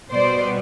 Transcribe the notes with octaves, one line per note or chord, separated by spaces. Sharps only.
B2 G3 B3 C5 D5